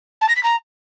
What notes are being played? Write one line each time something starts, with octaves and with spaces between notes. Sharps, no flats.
A5
A#6
B6
A#5